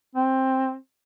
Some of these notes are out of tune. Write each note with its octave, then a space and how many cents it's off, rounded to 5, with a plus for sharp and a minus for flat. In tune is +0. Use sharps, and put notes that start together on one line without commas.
C4 +10